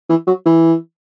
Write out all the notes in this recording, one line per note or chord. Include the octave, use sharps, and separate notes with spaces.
E3
F#3
E3